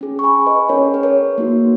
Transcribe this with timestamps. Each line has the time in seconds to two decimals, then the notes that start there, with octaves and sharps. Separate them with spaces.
0.01 C#4 G#4
0.19 C#6
0.24 G#5 B5
0.47 B4 D#5
0.69 C#4 G#4 A#4 C#5
0.94 B4
1.03 A#4 C#5
1.38 A#3 D#4 F#4